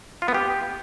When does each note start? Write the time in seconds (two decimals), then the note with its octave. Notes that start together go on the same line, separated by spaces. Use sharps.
0.22 F4
0.28 B3
0.34 G4